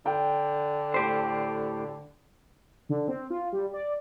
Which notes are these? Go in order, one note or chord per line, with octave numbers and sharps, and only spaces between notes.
D3 G5
A2 G4 C5
D3
C4
F4
G3
D5